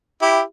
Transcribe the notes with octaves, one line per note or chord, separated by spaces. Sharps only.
E4 G4